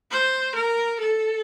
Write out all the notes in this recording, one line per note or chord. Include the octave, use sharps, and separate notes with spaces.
C5
A#4
A4